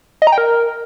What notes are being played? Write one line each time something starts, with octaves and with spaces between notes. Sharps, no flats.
D#5
A#5
G5
A#4